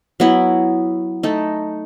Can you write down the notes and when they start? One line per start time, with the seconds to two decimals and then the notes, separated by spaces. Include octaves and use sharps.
0.20 F#3 B3 E4
1.23 A3 D#4 A4